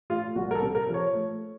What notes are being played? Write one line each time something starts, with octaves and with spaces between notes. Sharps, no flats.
A3 F4
C2 F#4
A#4
A4
C3
A#4
F3
C#5
A3